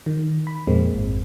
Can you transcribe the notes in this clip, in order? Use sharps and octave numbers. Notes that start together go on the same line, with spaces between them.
D#3
B5
F2 A#2 G#3 A#3 C4
G#1